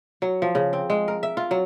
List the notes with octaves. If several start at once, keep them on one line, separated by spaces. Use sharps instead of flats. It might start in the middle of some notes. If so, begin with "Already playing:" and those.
F#3
F3
C#3
C4
G#3
A#4
E5
F4
F#3